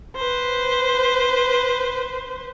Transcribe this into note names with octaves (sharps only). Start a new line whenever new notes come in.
B4 C5